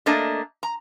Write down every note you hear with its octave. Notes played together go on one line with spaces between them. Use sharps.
A3 A#3 D4 D#5
A#5